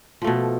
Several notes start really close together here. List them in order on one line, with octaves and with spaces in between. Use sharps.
F3 A3 B2